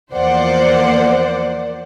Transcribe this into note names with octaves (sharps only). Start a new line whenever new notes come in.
E2 F3 A#3 C5 D5 F#5